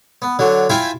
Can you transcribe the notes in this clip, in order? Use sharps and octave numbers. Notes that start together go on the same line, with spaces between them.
B3
D3 F#3
E4 F4 E5 F5 G5 G#5